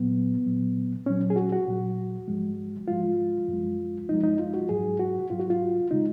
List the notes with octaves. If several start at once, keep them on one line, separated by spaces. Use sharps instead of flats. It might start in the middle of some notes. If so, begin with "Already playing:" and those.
Already playing: A#2 F#3 B3
A#2 F#3
A#2 F#3 C#4
G#4
F#4
F#4
A#2 F#3
G#2 F3 G#3
G#2 F3 G#3 F4
F#2 F3 G#3
F#2 F3 G#3 D#4
D#4
F4
F#4
G#2 F#3 G#4
F#4
G#2 F#3 F4
F#4
F4
C#3 G#3 D#4